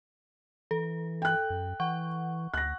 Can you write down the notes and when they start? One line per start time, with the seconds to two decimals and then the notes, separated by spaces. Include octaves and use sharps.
0.71 E3 A4
1.22 G5 F#6
1.50 F#2
1.80 E3 F#5 C#6
2.54 D2 F#6 A#6